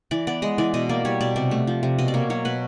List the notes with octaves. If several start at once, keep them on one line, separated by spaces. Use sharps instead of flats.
E3 D5
B3 D5
G#3 D#5
E3 D5
B2 D#5
A#3 D5
G3 C#5
B2 D5
C3 D5
A3
F3
C3
B2 D#5
D5
A#3 C#5
F#3 C#5
B2 B4